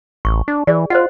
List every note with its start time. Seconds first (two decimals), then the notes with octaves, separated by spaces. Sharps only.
0.25 A1 C#6
0.48 D4
0.67 E3 G#4 D5
0.90 F4 C5 D#5 F#5